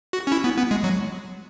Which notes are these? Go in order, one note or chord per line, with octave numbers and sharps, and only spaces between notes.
F#4
C#4
E4
B3
B3
G#3
F#3